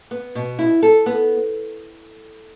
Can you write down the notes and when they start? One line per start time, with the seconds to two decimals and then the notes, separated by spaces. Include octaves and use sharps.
0.11 B3
0.35 B2
0.59 E4
0.82 A4
1.06 B3